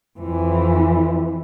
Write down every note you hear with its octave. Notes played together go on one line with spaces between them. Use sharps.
F2 E3